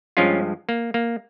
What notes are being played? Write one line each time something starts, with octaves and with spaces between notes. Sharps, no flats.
G2 F3 G#3 C#4 F4
A#3
A#3